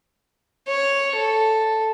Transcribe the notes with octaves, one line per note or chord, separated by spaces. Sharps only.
C#5
A4